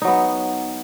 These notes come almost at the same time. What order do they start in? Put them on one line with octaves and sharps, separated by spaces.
D#4 F#3 B3